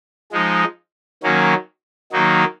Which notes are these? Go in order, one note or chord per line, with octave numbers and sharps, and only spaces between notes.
F3 G#3 D#4
D#3 F#3 A#3 C#4
D#3 F#3 A#3 D#4